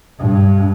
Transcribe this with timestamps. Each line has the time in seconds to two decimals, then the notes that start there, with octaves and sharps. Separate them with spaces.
0.20 G2